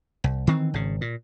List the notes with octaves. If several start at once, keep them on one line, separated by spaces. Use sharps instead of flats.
C2
D#3 E3 C4
G#1 C#3
A#2